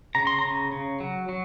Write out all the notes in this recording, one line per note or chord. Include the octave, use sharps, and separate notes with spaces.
C#3 A#5
C6
A#5
C#3
C#3
F#3
F#3